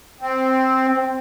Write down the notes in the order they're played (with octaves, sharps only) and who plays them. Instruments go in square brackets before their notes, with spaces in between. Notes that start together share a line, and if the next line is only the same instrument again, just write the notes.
[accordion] C4